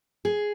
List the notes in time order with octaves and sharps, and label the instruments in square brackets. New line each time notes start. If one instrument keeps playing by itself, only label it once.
[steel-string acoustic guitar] G#4